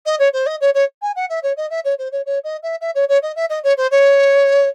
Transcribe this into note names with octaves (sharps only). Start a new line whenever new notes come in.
D#5
C#5
C5
D#5
C#5
C#5
G#5
F#5
E5
C#5
D#5
E5
C#5
C5
C#5
C#5
D#5
E5
E5
C#5
C#5
D#5
E5
D#5
C#5
C5
C#5